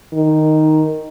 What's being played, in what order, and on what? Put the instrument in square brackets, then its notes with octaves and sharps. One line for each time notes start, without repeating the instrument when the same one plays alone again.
[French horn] D#3